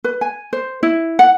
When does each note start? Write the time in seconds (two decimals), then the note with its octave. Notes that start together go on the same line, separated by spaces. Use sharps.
0.04 B4
0.21 G#5
0.53 C5
0.83 E4
1.19 F#5